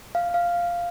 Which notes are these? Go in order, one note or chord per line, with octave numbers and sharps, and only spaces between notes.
F5
F5